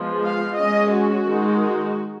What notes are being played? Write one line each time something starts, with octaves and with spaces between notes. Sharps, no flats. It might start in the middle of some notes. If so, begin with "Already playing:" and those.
Already playing: F3 G#3 B3
F5
G#3 C#4 D#5
F#4
D#3 G#3 D#4
F#4